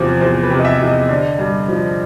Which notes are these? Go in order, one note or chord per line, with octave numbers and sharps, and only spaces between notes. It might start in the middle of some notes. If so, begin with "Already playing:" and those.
Already playing: E2 C3 F3 C5
E2 C5
B4
C3
D#5
E5
E2
D#5
D3
G2
F3